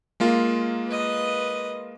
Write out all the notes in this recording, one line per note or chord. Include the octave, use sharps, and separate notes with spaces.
G#3 A#3 F4
B4 D#5